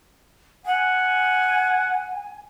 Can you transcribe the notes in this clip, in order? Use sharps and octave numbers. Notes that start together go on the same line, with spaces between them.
F#5 G#5